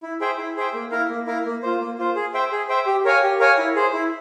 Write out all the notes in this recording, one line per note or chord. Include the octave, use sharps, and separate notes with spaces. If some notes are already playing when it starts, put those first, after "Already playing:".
E4
G#4 C5 E5 G5
E4
G#4 C5 E5 G5
A#3
E4 A#4 F5
A#3
E4 A#4 F5
A#3
F4 C5
A#3
F4 C5
G#4
C5 E5 G5
G#4
C5 E5 G5
G4
A#4 C#5 F5 G#5
G4
A#4 C#5 F5 G#5
E4
G#4 C5
E4